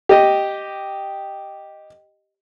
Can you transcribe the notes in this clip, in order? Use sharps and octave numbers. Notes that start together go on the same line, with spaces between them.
G4 D#5